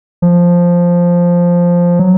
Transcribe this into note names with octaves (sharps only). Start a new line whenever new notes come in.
F3
F#3